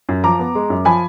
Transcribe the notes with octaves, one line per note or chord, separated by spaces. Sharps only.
F#2
F3 A#5 D6
B3
G#3
F#2
F3 G#5 B5